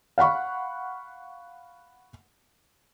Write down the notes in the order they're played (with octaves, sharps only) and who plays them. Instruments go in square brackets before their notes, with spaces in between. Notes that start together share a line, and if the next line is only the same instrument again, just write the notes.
[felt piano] F5 F#5 B5 C#6